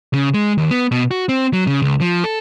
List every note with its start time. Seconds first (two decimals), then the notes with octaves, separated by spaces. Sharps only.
0.14 C#3
0.34 G#3
0.58 D#2
0.71 B3
0.91 B2
1.11 F#4
1.29 C4
1.53 F#3
1.67 C#3
1.82 C#2
2.01 F3
2.24 A4